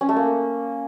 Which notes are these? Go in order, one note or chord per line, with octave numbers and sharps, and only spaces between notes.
C#4
A3
A#3